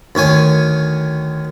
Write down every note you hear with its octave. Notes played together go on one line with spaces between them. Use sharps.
D2 D#3 C#5 G#5